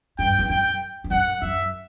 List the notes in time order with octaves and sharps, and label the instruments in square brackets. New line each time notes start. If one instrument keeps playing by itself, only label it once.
[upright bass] G2 [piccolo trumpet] G5
[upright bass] E2
[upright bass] F#2 [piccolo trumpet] G5
[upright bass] G2
[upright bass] F#2 [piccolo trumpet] F#5
[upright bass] F#2 [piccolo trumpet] E5